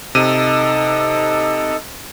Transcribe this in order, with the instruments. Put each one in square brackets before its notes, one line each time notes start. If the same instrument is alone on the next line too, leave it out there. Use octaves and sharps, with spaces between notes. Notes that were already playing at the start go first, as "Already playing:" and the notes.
[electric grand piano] C3 D#7 [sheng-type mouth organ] D#4 A4